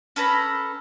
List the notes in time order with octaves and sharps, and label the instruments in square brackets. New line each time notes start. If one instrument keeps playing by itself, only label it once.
[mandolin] C#4 A4 B4 A#5